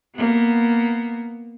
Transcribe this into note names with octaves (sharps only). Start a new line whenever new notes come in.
A#3 B3